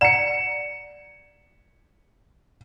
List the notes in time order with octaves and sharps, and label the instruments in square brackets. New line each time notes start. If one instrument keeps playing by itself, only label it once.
[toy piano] D5 F#5 A#5 [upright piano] C#7 E7